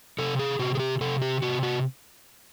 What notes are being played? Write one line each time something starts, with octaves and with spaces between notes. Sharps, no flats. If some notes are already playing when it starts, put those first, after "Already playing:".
C3 A4
G#4
C3 F#4
G#4
G4
C3 A4
G4
C3 F#4
F#4